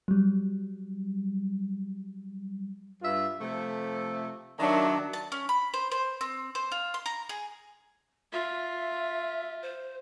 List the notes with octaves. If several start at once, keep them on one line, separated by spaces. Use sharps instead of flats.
F#3 G3
G2 F4 E5
C3 F3 A3
D#3 F#3 D4 E5
A5
C#4
B5
C5
C5
C4
C5
F4
C6
A#5
G#4
F4 E5
C5